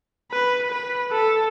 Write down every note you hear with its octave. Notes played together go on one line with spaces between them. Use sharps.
B4
B4
A4